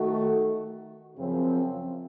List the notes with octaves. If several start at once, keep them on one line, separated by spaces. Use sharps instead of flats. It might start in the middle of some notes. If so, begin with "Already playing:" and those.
Already playing: D#3 A3 D#4 F#4
F#2 C#3 F3 C4